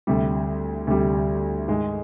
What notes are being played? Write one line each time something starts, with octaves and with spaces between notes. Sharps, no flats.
D2 C3 G3
D2 C3 G3
G#2 D#3 G#3